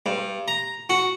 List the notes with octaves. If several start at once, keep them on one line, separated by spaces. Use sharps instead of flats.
G2
A#5
F#4